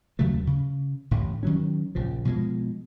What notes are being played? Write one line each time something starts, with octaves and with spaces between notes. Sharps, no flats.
D#2 C#3 F#3 A3
C#3
A1 A2 D3
D#3 F#3 C#4
A#1 C#3 F3
B2 F3 F#3 G#3